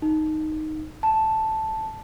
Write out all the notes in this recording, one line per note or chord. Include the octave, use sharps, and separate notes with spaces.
D#4
A5